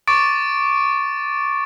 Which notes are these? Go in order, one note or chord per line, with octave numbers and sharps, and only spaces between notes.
C#6 D6 A6 D7